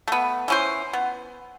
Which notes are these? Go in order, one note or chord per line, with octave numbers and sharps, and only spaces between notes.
A3 B3
E3 C#4 C5
B3